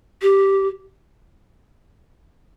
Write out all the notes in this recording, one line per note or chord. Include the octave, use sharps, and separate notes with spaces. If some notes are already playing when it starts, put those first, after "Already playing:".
G4